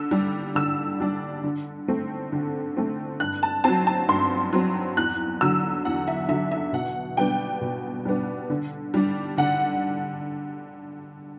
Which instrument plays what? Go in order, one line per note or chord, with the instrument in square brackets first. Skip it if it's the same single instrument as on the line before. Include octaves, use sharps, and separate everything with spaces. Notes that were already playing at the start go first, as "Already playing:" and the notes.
Already playing: [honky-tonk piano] D3 E6
G3 D4
D3 E6
G3 D4
D3
A3 C4
D3
A3 C4
G2 F#6
A5
F#3 C4 A5
A5
G2 C6
F#3 C4
E2 F#6
D3 F#3 E6
E2 F#5
E5
D3 F#3 E5
E5
B2 F#5
G3 B3 D4 G5
B2
G3 B3 D4
D3
G3 D4
D3 F#5